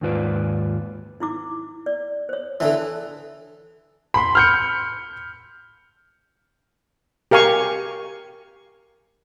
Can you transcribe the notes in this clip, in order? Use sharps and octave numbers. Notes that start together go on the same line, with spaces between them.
D#2 G#2 F4 B4 D5
D#4 E4 D6
D5
C5 C#5
D3 E3 A4 A5
B5 C6
F6 G6 C#7
G4 A#4 F5 G#5 C#6